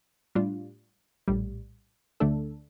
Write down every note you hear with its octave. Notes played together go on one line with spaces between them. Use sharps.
A2 G3 D4 F4
A#1 A2 G3
D2 D3 A3 D4 A4